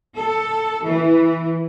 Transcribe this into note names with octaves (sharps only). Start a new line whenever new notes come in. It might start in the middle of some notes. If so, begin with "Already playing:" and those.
A4
E3